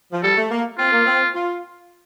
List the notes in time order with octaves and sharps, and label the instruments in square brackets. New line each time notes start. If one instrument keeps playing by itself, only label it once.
[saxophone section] F3
[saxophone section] G3 [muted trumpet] A4
[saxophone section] A3
A#3
[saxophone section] C4 [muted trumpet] F4
[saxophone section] A#3
C4
F4